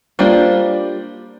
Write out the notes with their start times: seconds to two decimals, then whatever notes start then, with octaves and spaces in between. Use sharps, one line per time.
0.19 G3 A#3 D4 F4 C5